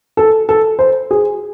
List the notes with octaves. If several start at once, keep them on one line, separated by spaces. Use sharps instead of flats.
A4
A4
C5
G#4